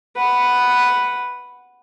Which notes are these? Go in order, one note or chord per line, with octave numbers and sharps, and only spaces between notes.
B4 F#5